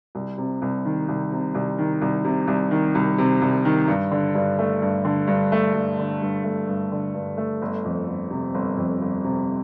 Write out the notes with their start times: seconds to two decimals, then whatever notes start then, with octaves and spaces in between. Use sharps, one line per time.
0.15 C2
0.38 C3
0.62 C2
0.85 D#3
1.08 C2
1.32 C3
1.55 C2
1.78 D#3
2.01 C2
2.25 C3
2.48 C2
2.71 D#3
2.95 C2
3.18 C3
3.42 C2
3.65 D#3
3.88 G2
4.11 D3
4.35 G2
4.59 A3
4.82 G2
5.05 D3
5.27 G2
5.52 A3
5.74 G2
5.99 D3
6.21 G2
6.44 A3
6.68 G2
6.92 D3
7.14 G2
7.37 A3
7.62 G1
7.85 F2
8.08 G1
8.31 C3
8.54 G1
8.77 F2
9.01 G1
9.24 C3